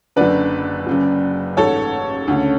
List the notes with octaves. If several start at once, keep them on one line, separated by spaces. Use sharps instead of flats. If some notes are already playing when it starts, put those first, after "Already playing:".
F#1 F#2 D3 B4 D5
F#1 F#2 C#3
A1 G#2 A4 C#5
D2 C#3